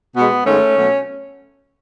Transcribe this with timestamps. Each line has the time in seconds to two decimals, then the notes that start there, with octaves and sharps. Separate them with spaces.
0.16 B2 G#3 B3
0.46 G#2 D#3 G#3 A3 C#4
0.76 B2 F#3 A3